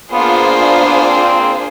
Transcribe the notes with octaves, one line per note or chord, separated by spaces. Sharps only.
A#3 B3 D4 F4 G#4 C5
B3
C4